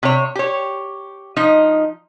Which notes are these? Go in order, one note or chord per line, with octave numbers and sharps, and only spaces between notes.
C3 C#5
G4 C#5
F3 D#4 D#5